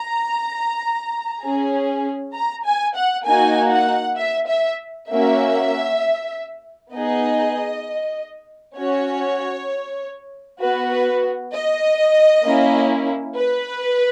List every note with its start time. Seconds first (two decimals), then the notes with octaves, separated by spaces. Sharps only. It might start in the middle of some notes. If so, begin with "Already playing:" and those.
Already playing: A#5
1.42 C#4 G#4
2.34 A#5
2.65 G#5
2.96 F#5
3.25 A#3 D#4 F#4 G#5
3.72 F#5
4.17 E5
4.48 E5
5.09 A#3 C#4 F#4 E5
6.93 B3 D#4 G#4 D#5
8.77 C#4 F#4 C#5
10.60 B3 F#4 B4
10.91 B4
11.53 D#5
12.45 A#3 C#4 E4
13.36 B4